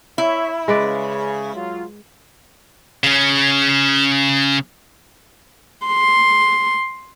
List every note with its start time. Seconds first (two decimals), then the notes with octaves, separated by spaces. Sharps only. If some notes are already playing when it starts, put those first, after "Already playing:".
0.18 E4 C#5 E5
0.68 C#3 G#3 B4 D5
1.54 F#3 F4
3.04 C#3 C#4
5.87 C6